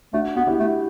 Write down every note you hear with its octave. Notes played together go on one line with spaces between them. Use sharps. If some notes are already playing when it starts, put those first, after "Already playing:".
A3 D4 F#4
B3 F#4
E4 G4
A3